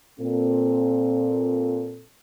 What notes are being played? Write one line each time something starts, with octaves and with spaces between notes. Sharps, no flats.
A#2 C4 A4